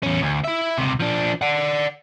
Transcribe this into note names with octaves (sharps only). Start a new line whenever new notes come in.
E2 C#4
D2
E4 E5
C#2 C3
F3 D4
D5 F#5